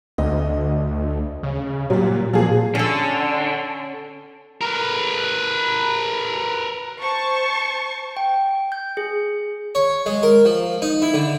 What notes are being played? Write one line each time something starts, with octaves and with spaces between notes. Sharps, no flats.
D2 D#5
C#3
A#2 F#3 G3
A#2 F3 G#4
D3 C#4 A4
A#4 B4
C5 A5 C#6
G5
G6
G#4
C#5
G#3
A#4
F3
D#4
E4
D3